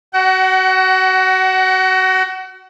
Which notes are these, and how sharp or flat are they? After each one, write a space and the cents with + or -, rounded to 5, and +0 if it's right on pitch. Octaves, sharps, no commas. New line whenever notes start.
F#4 +20 F#5 +40